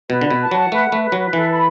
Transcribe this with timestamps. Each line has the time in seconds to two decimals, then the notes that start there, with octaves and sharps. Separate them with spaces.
0.10 B2 B4
0.21 D3
0.26 B2 B4
0.40 A5
0.51 F#3 F#5
0.72 A3 B4
0.87 B4
0.92 A3
1.02 B4
1.12 F#3
1.18 B4
1.33 E3 A4
1.49 B5